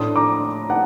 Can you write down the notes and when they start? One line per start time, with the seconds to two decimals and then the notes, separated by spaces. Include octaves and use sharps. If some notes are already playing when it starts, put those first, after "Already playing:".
Already playing: A2 A3 D4 C6 D#6
0.16 A#5 D6
0.70 F#5 A5